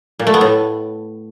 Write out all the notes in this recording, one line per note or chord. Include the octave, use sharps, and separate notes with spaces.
A#2
A3
B3
A2